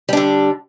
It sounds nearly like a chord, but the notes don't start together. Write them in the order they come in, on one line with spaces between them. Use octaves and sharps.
G3 D4 D3